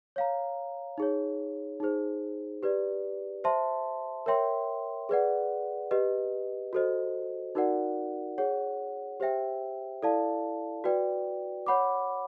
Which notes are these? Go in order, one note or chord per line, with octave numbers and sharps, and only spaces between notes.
C#5 F5 A#5
D#4 G#4 C#5
D#4 G#4 C5
G4 B4 D5
C5 E5 A5 C6
A#4 C#5 E5 G5 C6
G#4 B4 D5 F#5
G4 B4 D#5
F#4 A4 C5 D#5
D#4 F#4 A#4 D5 F#5
G#4 C#5 F#5
G4 C5 E5 G5
E4 A4 D5 F5 A5
F#4 B4 D5 G5
C#5 F#5 B5 D6